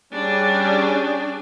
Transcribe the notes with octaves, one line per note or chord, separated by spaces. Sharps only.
G3 C#4 D4 G#4